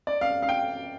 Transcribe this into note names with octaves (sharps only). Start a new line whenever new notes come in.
D5
F5
F5
G5